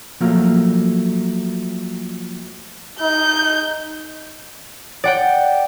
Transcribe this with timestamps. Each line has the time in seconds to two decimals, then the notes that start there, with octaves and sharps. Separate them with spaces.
0.21 F3 F#3 A3 A#3 F5
3.00 D#4 G6
5.04 D5 F#5 G5